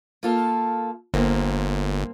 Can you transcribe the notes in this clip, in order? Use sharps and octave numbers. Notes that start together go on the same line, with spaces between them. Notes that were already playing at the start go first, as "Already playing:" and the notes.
A#3 F4 A4
G1 G2 A#3 C4